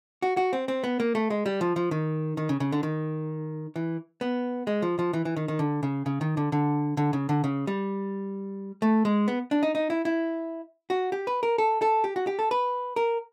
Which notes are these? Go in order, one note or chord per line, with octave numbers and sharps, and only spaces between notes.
F#4
F#4
C4
C4
B3
A#3
A3
G#3
G3
F3
F3
D#3
D#3
C#3
C#3
D3
D#3
E3
B3
G#3
F3
F3
E3
E3
D#3
D#3
D3
C#3
C#3
D#3
D3
D3
D3
C#3
D3
C#3
G3
A3
G#3
B3
D4
D#4
D#4
E4
E4
F#4
G4
B4
A#4
A4
A4
G4
F#4
G4
A4
B4
A#4